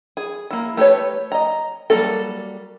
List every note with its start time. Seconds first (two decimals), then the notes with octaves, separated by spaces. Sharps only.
0.17 G#4
0.51 A#3 E4
0.77 A3 G4 B4 C#5
1.32 D#5 A#5
1.90 F#3 G3 A#3 A4